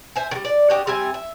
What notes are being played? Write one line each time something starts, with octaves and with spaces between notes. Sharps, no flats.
C5 E5 G#5
D#3 G3
D5
D4 F#4 G4 D#5
G3 C4 E5 G#5
E5